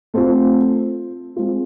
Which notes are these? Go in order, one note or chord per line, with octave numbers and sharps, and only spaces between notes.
A3 C4 F4
G#3 C4 F4